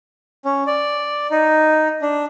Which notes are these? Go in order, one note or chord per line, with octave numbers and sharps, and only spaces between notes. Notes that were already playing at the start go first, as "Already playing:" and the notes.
C#4
D5
D#4
D4